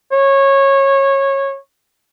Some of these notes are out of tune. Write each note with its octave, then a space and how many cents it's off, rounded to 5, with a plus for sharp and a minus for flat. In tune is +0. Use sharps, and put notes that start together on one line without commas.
C#5 -20